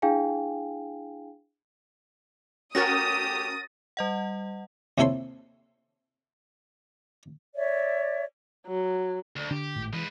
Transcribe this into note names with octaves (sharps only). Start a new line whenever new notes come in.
D4 E4 G#4 F5 G5 G#5
A3 C#4 F#4 G4 A#4 D#6 A6 A#6
G3 D#5 F#5
D#2 C3 E4 A4 C#5 C6
C#5 D5 E5
F#3
D2
D3 D4 G4
G#1 A2
E3 G#3 B4